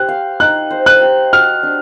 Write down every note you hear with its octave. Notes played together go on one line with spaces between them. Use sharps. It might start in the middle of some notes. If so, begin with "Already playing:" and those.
Already playing: G4 C5 F#6
F5
D#4 F#6
C5
F#6
G4
F#4 F6
D4